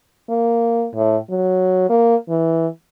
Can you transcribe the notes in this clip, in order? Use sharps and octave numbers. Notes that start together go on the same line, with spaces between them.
A#3
A2
F#3
A#3
E3